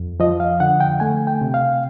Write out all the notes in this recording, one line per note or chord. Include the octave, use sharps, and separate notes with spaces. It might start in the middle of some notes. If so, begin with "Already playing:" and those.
Already playing: F2
F3 D#5
F5
D3 F#5
G5
A3 G#5
G5
C3
F5